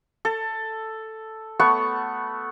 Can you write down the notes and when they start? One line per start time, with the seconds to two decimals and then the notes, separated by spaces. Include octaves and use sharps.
0.25 A4
1.59 A3 B3 F#5 C#6